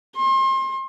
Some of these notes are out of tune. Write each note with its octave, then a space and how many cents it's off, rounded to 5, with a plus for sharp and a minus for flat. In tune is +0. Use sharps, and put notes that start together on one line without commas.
C6 +35